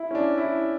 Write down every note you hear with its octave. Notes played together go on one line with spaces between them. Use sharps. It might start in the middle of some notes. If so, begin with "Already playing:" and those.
Already playing: E4
C#4
D4
E4